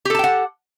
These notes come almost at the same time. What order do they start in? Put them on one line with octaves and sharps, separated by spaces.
G4 A4 A5 G5 F#5